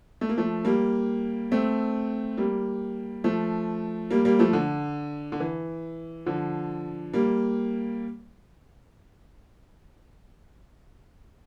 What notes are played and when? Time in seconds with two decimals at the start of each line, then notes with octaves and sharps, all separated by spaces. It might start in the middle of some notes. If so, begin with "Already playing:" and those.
0.21 A3
0.29 A#3
0.37 F3 A3
0.65 G3 A#3
1.52 A3 C4
2.37 G3 A#3
3.24 F3 A3
4.11 G3 A#3
4.25 G3 A#3
4.39 F3 A3
4.53 D3
5.32 D3
5.40 E3
6.26 D3 F3
7.14 G3 A#3